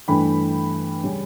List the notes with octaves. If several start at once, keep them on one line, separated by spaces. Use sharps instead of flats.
G2 E3 A3 D4 G5 B5
C#3 G3 C#4